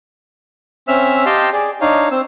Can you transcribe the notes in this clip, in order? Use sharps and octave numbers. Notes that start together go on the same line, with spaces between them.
C4 C#4 E5 E6 F6
G4 D#5 F5 G5 A5 C6
G#4 D5
D4 D#4 C#5 F5
C4 E6